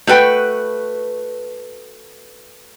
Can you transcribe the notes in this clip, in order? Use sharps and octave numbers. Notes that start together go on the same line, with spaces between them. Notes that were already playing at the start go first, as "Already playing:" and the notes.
A3 F#4 B4 G5